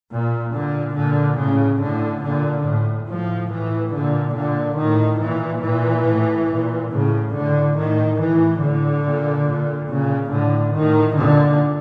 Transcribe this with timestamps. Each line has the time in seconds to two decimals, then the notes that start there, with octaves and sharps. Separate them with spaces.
0.12 A#2
0.53 A#2 D3
0.96 A#2 D3
1.38 A2 C#3
1.81 A2 D3
2.24 A#2 D3
2.66 A2
3.09 A2 F3
3.51 A2 E3
3.94 A#2 D3
4.36 A#2 D3
4.79 A2 D#3
5.21 A#2 E3
5.64 A#2 E3
6.06 A2
6.50 A#2
6.92 A2 C#3
7.34 A2 D3
7.77 A2 D#3
8.19 A2 E3
8.62 A2 D3
9.05 A#2
9.48 A#2
9.89 A#2 C#3
10.32 A2 D3
10.75 A2 D#3
11.16 A#2 D3